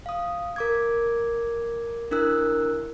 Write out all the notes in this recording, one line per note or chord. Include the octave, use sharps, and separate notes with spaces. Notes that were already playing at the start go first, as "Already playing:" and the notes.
F5 D#6
A#4 D6 G#6
D4 E4 A#4 E6 F#6